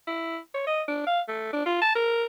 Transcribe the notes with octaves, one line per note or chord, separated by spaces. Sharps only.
E4
C#5
D#5
D4
F5
A3
D4
F4
A5
A#4